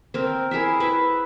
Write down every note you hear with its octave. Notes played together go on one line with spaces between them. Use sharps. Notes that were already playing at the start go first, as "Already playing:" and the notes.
C4 A#4
E4 G#4 A#4 E5
E4 B4 E5